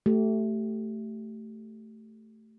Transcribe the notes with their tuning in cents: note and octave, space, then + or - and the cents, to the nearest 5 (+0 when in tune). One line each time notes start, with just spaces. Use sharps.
A3 +0 G4 -25